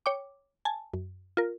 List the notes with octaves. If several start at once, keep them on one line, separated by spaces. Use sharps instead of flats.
C#5 G5 D6
G#5 A5
F#2
F4 A#4